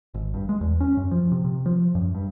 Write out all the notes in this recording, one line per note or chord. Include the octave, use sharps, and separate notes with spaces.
G#1
G2
G#3
E2
C#4
F#2
F3
C3
C3
F3
F#2
G2